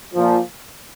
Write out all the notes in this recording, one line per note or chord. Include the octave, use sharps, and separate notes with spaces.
A#2 F3